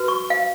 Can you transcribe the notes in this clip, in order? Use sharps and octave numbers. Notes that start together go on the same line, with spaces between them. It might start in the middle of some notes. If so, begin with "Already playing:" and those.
Already playing: F#4 B4
C#6
F5